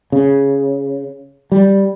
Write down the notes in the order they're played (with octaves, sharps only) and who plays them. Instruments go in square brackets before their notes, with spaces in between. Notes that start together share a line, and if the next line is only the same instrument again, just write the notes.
[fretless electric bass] C#3
G3